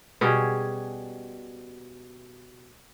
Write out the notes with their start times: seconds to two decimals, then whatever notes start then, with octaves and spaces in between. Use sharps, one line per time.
0.21 B2 G3 C#4 G#4